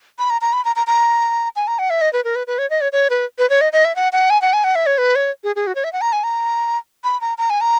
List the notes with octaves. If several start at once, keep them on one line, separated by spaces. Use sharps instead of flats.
B5
A#5
A#5
B5
A#5
A#5
A#5
G#5
A#5
F#5
E5
D#5
B4
A#4
B4
B4
C#5
D#5
C#5
C#5
B4
B4
C#5
D#5
D#5
E5
F#5
F#5
G#5
F#5
G#5
F#5
E5
C#5
B4
C#5
G#4
G#4
F#4
C#5
E5
F#5
A#5
G#5
A#5
B5
A#5
A#5
G#5
A#5